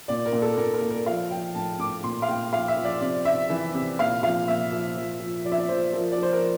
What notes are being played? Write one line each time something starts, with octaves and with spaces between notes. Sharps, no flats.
A#2 D5
A#4
A#2
A4
A#2 A#4
A#4
A#2
A#4
F3 F5
F3 G5
A2 A5
A2 D6
A#2 C6
F5
A#2 G5
F3 F5
E5
F3
D5
C3 D5
C3 E5
E3
C3
A#2 F5
F3 F5
A#2 E5
F3
F3
F3
F3 D5
E5
D5
F3 C5
F3 A#4
D5
F3
C5
A#4